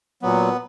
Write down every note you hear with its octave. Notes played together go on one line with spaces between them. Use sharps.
A#2 F#3 B3